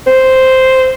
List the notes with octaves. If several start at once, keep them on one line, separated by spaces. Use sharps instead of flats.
C5